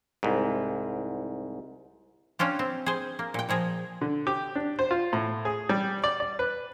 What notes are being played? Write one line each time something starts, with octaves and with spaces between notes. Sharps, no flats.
C2 G#2
C#4 D4 F4 G4
C4
G#4 C5
A#3
A#2 G5
A#2 F3 G#4 A#5
D3
G4
D4
C5
F4
A2
G#4
G3
D5
D5
B4